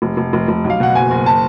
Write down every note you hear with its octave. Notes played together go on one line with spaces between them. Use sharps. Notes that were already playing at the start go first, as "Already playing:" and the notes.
F1
F1
F1
F1
B1
F5
B2 F#5
F#1 G#5
F#1
A5